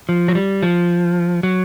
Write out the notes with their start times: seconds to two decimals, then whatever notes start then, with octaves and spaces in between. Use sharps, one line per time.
0.09 F3
0.28 F#3
0.35 G3
0.63 F3
1.43 F#3